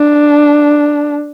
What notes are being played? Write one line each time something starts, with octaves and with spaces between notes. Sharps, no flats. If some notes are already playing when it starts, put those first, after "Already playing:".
Already playing: D4